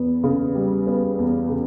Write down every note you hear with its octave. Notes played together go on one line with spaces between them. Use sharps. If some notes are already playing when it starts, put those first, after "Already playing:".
Already playing: E2 B3
C#3
G3
B3
E2
C#3